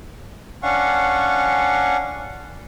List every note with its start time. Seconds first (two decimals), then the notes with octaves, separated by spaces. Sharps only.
0.63 C#4 D4 F5 F#5 C#6